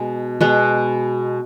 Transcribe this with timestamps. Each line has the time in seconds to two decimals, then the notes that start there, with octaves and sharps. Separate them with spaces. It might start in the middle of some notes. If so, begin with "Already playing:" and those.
Already playing: B2 G#3
0.41 B2 G#3 B3